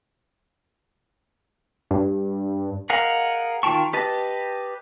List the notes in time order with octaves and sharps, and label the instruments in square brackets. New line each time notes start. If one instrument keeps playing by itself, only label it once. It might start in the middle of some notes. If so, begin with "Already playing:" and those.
[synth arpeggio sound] G2
[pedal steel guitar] G#4 A#4 D#5 F5 F#5
D#3 F4 G5 A5 C#6
G4 B4 D#5 A5